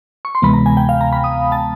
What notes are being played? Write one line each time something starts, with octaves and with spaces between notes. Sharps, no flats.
C#6
C6
D2 C3 E3 G#3 B3 B5
A#5
G#5
G5
F5
A#5
B5
D#6
A5